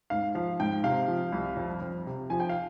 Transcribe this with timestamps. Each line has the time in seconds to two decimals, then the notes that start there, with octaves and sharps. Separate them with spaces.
0.10 G#2 F5
0.35 F3 F5
0.60 G#2 G5
0.84 C3 F5
1.08 F3
1.33 C2
1.57 F2
1.82 F2
2.06 C3
2.30 F3 G#5
2.40 G5
2.49 F5